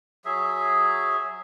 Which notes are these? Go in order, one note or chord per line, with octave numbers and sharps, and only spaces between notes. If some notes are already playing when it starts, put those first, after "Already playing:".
F#3 G#4 E5